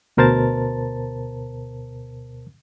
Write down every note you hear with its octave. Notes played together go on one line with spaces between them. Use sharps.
D2 B2 A#4 C5 A5 A6